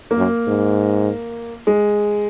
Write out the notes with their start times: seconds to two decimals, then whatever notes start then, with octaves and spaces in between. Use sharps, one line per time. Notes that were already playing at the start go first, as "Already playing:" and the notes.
0.11 A#3
0.17 F#2
0.47 G#2
1.67 G#3